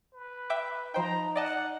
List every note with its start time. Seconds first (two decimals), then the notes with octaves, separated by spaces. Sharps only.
0.13 B4
0.50 E5 G5 D6
0.94 F3 D#4 C5 G5 A#5
1.36 D5 D#5 F#5 A5